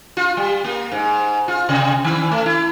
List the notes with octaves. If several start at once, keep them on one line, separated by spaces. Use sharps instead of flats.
F4
G3
A#3
G#2
F4
C3
D#3
A3
E4